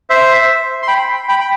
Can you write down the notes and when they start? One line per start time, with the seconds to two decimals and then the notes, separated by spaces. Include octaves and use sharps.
0.10 C5 E5
0.83 C6
0.88 G5 B5
1.28 G5 B5
1.41 G5